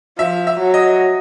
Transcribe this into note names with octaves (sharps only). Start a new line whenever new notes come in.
F3 E5
E5
F#3
D#5